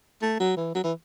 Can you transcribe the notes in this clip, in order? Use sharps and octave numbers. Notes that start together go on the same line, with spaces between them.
A3
F#3
E3
F#3
E3